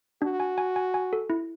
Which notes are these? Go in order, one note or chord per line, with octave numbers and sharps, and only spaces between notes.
D4 F#4
G#5
G#5
G#5
G#5
A4
E4